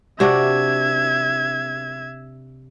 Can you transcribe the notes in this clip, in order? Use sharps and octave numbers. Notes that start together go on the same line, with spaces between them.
C3 D4 F#4 E5 G#6